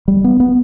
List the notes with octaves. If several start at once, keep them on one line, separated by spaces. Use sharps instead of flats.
G3
B3
B3